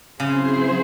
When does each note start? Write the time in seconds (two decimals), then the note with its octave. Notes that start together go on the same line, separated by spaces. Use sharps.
0.20 C#3 F#3 C4 E4 G#4 C5